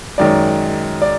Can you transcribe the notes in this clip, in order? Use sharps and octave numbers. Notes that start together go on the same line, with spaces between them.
F#2 D#3 G#3 C#4 D5
D5